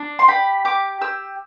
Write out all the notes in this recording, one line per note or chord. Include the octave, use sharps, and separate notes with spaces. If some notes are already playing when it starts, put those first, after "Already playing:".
Already playing: D4
C6
G4 B5
G4 D6
G4 E6